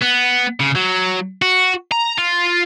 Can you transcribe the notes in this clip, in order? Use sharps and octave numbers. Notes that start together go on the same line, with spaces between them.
B3
C#3
F#3
F#4
A#5
F4